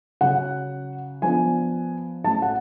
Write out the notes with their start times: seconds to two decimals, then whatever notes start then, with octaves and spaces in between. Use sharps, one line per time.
0.21 C#3 F#3 C#4 F#5
1.22 F3 B3 D4 G#5
2.24 A2 F#3 C#4 A5
2.42 F#5